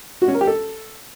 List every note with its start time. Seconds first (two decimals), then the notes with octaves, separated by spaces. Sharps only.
0.22 F#4
0.28 C#4
0.34 A#4
0.41 G4
0.47 A4